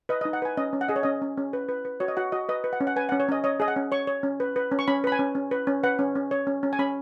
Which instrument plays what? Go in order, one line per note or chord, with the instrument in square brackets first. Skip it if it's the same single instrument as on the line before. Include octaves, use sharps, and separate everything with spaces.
[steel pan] B4 D#5
D#4 D#5
F#5
B4 G#5
C#4 D#5
C#4
F#5
G#4 D#5
C#5
C#4 D#5
C#4
C#4
B4
B4
B4
F#4 C#5
D#5
F#4 F#5
F#4 D#5
B4 D#5
B4
F#5
C#4
F#5
B4 G#5
C#4 F#5
C#5
C#4 D#5
C#5 D#5
G#4 D#5
F#5
C#4
C#5 C#6
C#5
C#4
B4
B4
C#4
C#6
C#4 B5
B4 B5
G#5
C#4
C#4
B4
C#4
B4 F#5
C#4
C#4
C#5
C#4
C#4
G#5
C#4 B5